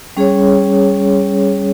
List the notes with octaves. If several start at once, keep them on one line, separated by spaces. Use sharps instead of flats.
G3 C#4 G#4 C#5